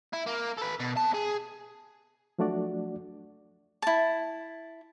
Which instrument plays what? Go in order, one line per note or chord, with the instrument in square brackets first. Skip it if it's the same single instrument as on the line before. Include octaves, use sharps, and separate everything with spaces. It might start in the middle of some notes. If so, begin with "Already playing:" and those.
[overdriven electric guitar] E4
A#3
A4 B4
B2
C4 A5
G#4
[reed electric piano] F3 F#3 A3 D4 F#4 D5
[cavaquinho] E4 A5